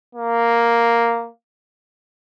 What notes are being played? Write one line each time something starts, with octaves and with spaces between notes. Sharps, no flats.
A#3